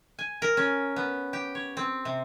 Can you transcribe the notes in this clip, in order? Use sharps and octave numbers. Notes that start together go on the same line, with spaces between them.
G#5
A#4
C#4
B3
G4
C#5
C4
C3